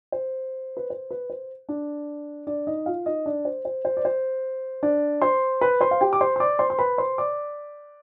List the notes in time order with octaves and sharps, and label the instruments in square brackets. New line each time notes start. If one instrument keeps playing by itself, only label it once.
[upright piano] C5
B4
C5
B4
C5
D4 D5
D4 D5
D#4 D#5
F4 F5
D#4 D#5
D4 D5
C5
C5
C5
D5
C5
D4 D5
C5 C6
B4 B5
C5 C6
F5
G4 G5
D6
C5 C6
C6
D5 D6
C5 C6
C6
B4 B5
C5 C6
D5 D6